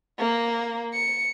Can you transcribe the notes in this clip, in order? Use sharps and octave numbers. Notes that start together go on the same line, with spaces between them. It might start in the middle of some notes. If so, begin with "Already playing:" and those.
A#3
C#7